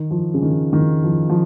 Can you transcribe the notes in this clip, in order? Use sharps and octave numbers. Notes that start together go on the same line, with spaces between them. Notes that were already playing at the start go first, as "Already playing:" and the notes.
Already playing: D#3
F3
C#3
D#3
D#3
F3
F3